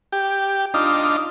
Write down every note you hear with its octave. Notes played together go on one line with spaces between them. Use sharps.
G4
D4 D#4 F4